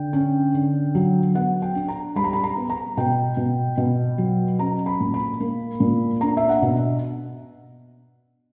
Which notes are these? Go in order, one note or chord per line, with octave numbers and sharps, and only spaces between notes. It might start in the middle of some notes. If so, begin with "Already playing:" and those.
Already playing: D3 G5
C#4
D3
F#3
B3 F#5
G5
D4
A#5
G3 B5
A#5
B5
A#5
B3
A#5
B2 G5
B2
B2
F#3
C#4 A#5
B5
A#2
B5
A#3
A#2
D4 A#5
E5
F#5
B2